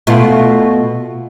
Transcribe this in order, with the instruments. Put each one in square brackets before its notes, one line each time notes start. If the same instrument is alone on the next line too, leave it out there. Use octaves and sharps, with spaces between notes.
[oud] B2 A3 F4